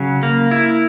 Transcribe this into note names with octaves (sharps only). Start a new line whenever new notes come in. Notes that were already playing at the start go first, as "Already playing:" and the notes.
Already playing: C#3 F#3
A#3
E4